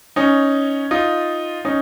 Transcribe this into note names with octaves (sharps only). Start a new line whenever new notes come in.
C#4 D#4
D#4 F4
C#4 D#4